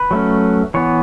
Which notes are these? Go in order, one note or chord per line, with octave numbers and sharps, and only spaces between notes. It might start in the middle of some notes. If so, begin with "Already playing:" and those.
Already playing: B4
F#3 A3 C#4
E3 B3 C#5